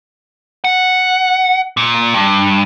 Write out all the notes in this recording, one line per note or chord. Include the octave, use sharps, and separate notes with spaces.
F#5
A#2
G2